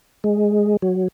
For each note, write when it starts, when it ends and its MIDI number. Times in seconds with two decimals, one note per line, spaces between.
0.24 0.77 56
0.82 1.08 54